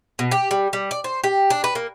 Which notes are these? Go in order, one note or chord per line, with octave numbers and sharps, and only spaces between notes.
B2
G4
G3
G3
D5
C5
G4
D4
B4
A#3